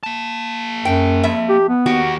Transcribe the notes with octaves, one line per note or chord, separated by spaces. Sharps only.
A#3 A5
F#2 G5
F2 E5
G4
B3
D#2 F#4 G4